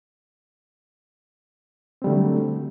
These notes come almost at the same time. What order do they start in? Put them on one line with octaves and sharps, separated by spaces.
C4 G3 D3 A3 F#3